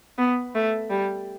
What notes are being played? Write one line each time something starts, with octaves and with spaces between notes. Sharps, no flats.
B3
A3
G3